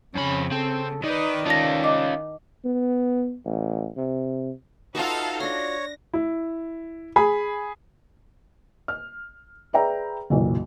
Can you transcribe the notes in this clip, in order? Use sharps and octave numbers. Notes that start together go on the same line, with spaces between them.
F2 C#3 C#4 B5
C4 A4
D#3 B4 D5 D#5
D#3 C#4 F4 A5 A#6
D#5 D6
B3
A1
C3
D#4 F4 F#4 A4 B4 E5 F5 A5
D4 C#5 C6 A#6
E4
G#4 B5
F6
G#4 B4 D5 E5 G5 A#5
F#1 B1 A#2 E3